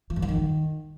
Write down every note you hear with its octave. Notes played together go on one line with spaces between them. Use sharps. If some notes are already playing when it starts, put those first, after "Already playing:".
F3
F#2
F3
D#3